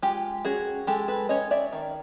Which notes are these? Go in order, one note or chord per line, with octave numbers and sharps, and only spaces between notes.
G#3 F4 G4
C#4 F#4 G#4
G#3 G4 A4
A4 B4
C#4 C#5 D#5
D5 E5
D#3